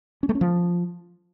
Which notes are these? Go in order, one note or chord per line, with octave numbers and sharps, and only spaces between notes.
C#4
A3
C#4
F3